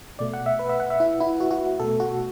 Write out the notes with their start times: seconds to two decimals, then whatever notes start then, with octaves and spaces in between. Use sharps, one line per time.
0.19 B2 A3 D5
0.33 F#5
0.46 E5
0.59 B4
0.69 E5
0.80 F#5
0.90 E5
1.00 E4
1.20 E4
1.40 F#4
1.51 F#4
1.80 B2 A3 A4
2.00 F#4